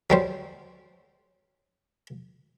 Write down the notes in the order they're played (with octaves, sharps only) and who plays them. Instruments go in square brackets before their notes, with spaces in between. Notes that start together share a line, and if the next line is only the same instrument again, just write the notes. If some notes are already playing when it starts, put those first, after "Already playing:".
[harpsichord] F#3 G3 C5